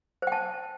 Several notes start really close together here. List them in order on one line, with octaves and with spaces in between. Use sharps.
C5 G5 A5